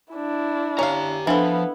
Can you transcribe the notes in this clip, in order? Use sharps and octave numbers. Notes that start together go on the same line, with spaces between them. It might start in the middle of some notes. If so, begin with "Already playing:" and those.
D4 E4
C#4 G4 F5 A#5
F3 B3 C4 D4 E4 A4 F5